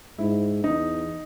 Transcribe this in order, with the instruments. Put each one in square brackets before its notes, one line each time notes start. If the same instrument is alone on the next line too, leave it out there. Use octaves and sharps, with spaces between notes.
[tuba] G#2 [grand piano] E4
[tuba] E2 [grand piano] D#4